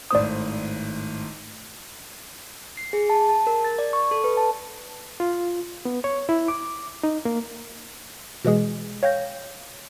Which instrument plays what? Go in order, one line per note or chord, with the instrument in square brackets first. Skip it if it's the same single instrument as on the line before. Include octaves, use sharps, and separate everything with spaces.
[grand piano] G#1 A2 C5 [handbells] D5 D#6
[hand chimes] C7
G#4
A5
A5
A#4
A6
D5
C#6
A4
B4
A5
[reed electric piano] F4
B3
C#5
E4
D6
D#4
A#3
[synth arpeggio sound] B2 E3 G#3 G#4
C#5 F5 G5 G6 A#6